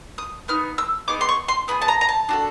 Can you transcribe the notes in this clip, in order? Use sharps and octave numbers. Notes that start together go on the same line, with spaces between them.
D#6
B3 D#4 F6
E6
B3 D#4 G#4 D6
C6
C#6
C6
B3 D#4 G#4 B5
A5
A#5
A#5
A5
D4 F#4 A4